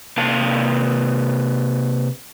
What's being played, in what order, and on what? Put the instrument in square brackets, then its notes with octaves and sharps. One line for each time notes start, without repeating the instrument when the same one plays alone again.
[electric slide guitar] C3 A#3 F5 A5